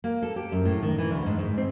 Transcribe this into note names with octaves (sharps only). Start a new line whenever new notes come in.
A#3
A4
G4
F#2
A2
D#3
E3
D2
G#2
G#2
C4